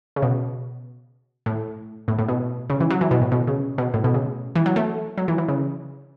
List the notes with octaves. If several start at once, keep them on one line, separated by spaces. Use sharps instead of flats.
C#3
B2
A2
A2
A2
B2
C#3
E3
F#3
E3
B2
A2
B2
C#3
B2
A2
B2
C#3
E3
F#3
A3
F#3
E3
E3
C#3